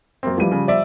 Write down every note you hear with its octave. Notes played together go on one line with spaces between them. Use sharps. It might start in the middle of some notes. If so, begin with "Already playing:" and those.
F#2 A#3 C4
E3 F3 G3 D#7
C#3
C5 D5 E5